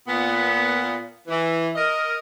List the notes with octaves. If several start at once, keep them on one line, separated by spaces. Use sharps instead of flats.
A#2 B3
E3
A#4 D#5